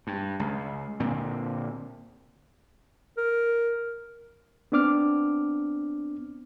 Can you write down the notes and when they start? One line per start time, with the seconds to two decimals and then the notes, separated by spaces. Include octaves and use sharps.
0.07 G2
0.40 C#2
1.00 A#2 D3 C4
3.17 A#4
4.72 B3 C4 D4 D6 F6